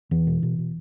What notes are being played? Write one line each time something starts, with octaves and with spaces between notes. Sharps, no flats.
E2 E3
B2
B2
B2